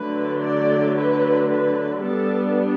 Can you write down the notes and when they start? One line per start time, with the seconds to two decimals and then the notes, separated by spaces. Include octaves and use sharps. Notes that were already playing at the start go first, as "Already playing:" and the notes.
Already playing: D3 F#3 A3 B4
0.42 D5
0.95 B4
1.50 B4
2.03 G3 B3 D4 A4